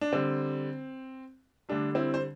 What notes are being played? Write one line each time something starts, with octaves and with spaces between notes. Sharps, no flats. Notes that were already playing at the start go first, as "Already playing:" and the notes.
D4
D3 G3 C4
D3 G3 A3 D4
C4 E4
C5